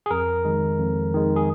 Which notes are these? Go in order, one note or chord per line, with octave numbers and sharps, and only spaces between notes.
G#4
F2 A#4
D#3 G#3
F2
D#3 G#3
G#4